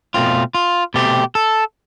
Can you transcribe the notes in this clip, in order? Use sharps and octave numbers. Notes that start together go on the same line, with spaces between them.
B2 A3 C4 F4
F4
B2 A3 C4 G4
A4